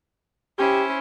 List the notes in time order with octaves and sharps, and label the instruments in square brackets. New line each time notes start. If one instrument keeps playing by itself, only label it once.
[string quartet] C#4 E4 C5 [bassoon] G4